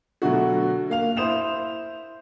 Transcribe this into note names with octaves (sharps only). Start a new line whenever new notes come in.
B2 D3 F#3 A3 D4 F#4
A#3 F5 F7
E4 C5 D#6 E7 F7